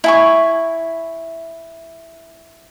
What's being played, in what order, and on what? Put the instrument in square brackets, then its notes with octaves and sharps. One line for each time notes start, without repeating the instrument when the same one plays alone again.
[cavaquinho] E4 G#5 C#6